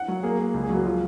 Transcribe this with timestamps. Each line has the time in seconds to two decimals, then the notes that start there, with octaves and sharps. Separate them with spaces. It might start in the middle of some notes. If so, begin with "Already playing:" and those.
Already playing: F#5
0.08 F#3
0.23 A#3 G#4
0.39 A#3
0.54 C#2
0.63 G#4
0.70 F#3
0.75 F#4
0.85 F3 F4